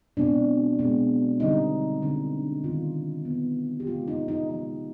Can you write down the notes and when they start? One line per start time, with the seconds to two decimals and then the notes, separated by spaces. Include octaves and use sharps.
0.17 B2 G#3 C4 D4
0.79 B2 G#3 C4
1.40 D3 G3 C4 D#4
2.02 D3 G3 C4
2.64 D#3 B3 F4
3.25 D#3 B3
3.80 G4
3.87 C3 F3 G#3 B3 F4
4.08 D#4
4.28 D#4
4.49 C3 F3 G#3 B3 D#4